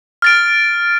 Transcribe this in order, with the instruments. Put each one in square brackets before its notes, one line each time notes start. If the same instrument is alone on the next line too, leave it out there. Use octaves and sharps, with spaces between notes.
[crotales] F6 A6 D7